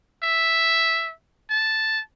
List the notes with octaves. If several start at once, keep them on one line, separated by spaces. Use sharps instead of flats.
E5
A5